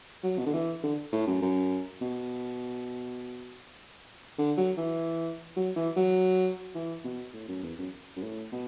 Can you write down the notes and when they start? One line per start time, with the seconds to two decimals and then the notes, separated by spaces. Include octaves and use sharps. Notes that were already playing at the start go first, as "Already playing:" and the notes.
0.23 F#3
0.39 B2
0.46 D3
0.53 E3
0.83 D3
1.12 A2
1.27 F#2
1.42 F#2
2.01 B2
4.38 D3
4.57 F#3
4.77 E3
5.56 F#3
5.76 E3
5.96 F#3
6.75 E3
7.04 B2
7.34 A2
7.48 F#2
7.63 E2
7.78 F#2
8.16 F#2
8.22 A2
8.52 B2